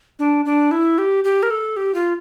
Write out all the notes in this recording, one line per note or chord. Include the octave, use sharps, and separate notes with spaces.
D4
D4
E4
G4
G4
A#4
A4
G4
F4